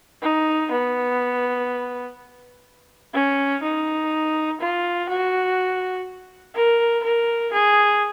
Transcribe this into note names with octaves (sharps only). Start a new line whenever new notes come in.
D#4
B3
C#4
D#4
F4
F#4
A#4
A#4
G#4